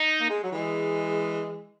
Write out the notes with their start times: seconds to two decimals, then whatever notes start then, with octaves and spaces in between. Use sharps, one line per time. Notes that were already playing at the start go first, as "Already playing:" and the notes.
Already playing: D#4
0.20 A#3
0.30 G#3
0.41 F#3
0.52 E3 G#3